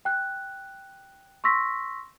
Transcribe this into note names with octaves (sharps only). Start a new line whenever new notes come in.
G5 F#6
C6 C#6 E6 A#6 B6